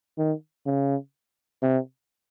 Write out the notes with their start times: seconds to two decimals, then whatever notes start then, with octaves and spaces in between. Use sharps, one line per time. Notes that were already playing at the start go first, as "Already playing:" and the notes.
0.18 D#3
0.66 C#3
1.63 C3